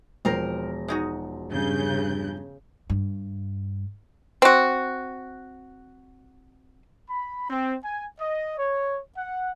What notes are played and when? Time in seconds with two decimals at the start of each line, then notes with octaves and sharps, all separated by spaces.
0.25 E1 F3 C4 A#4 A#6
0.88 G#3 D#4 F#4
1.51 G2 C#3 G6
2.90 G2
4.42 C4 F#4
7.09 B5
7.50 C4
7.84 G#5
8.20 D#5
8.58 C#5
9.17 F#5